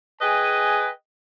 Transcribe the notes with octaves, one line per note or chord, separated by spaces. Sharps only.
G#4 B4 D#5 G5 G#5